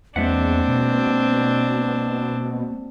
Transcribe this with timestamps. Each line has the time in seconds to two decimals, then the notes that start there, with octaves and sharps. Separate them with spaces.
0.16 E2 G#3 A#3 C4 D4 E5 F#5
0.68 B2